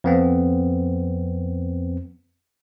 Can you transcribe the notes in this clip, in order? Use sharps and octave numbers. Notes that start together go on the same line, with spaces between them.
F2 B3 C4